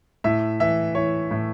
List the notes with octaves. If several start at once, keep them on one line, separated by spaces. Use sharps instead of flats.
A2 E5
E3 E5
E3 C#5
A2